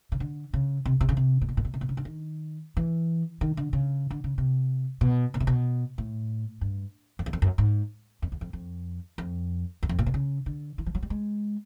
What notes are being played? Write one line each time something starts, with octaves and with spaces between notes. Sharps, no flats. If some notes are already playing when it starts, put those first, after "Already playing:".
C#3
D3
C#3
C3
C3
C#3
C3
A#2
B2
A#2
B2
C3
B2
C#3
D3
D#3
E3
D#3
D3
C#3
D3
C#3
C3
B2
B2
C3
B2
A2
G2
F2
E2
F2
F#2
G#2
F2
E2
F2
F2
F2
E2
F2
A#2
B2
C#3
D3
E3
F3
F#3
G3
G#3